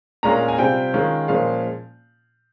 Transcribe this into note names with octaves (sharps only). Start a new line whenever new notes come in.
A#2 G#3 C#4 F4 A#5
G#5
C3 G3 C4 F4 G5
D#3 G#3 C#4 F4
A#2 F3 G#3 C#4 F4 F5